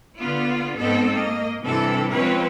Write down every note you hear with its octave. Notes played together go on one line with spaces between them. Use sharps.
D3 B3 F4
G#2 B3 C4 A4 D#5
A#3 D#5
G2 C3 E3 A4
F3 G#3 C4 C#4 B4 C#5